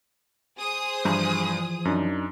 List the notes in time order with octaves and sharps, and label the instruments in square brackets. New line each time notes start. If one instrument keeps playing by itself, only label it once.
[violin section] G#4 C5 D#6
[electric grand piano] G2 [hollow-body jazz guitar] E3 F3 A#5
[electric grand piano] F#2 D4 D#4